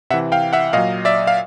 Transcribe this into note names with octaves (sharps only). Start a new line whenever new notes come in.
C3 E3 E5 F#5
F5 G5
E5 F#5
A#2 F#3 D#5 F5
D5 E5
F5